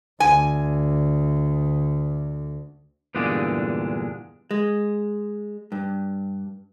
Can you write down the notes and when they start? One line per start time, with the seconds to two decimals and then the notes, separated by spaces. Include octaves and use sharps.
0.20 D2 G#5
3.15 E2 G2 A#2 D3 G#3 D4
4.51 G#3
5.72 G2